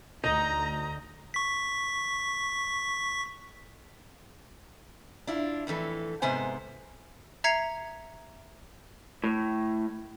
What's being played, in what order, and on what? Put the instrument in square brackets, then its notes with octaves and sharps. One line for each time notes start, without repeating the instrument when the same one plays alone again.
[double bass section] D2 [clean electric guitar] D#4 [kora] D#5 [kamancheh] A#5
[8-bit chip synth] C#6 B6
[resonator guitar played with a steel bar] D4 E4 F4
F2 A2 E3 A4
G#2 C3 B3 C5 G#5
[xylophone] E5 A#5 G#6 C7 C#7 F7
[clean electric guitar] A2